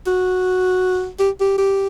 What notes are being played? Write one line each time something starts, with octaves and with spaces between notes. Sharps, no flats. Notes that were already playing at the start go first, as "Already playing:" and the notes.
F#4
G4
G4
G4